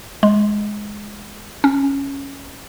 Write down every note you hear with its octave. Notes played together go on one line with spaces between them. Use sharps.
G#3
C#4